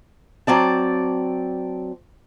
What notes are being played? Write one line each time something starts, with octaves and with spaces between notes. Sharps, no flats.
F#3 C4 D5 A5